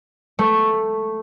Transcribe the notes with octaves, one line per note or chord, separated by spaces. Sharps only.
A3